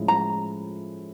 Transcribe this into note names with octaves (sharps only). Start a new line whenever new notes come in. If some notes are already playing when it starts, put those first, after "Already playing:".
Already playing: A2 F3 G#3 C#4 E4
A#5